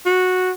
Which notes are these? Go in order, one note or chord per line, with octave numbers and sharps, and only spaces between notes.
F#4